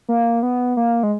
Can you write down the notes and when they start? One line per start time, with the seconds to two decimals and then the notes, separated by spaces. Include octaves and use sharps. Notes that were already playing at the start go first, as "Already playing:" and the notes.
0.09 A#3
0.43 B3
0.77 A#3
1.03 G#3